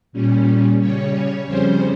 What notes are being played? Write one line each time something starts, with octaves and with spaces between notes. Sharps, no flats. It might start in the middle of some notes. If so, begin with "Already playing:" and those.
A#2 G3 C#4
C#3 G3 C#4 C#5
F2 C#3 G3 C#4 C5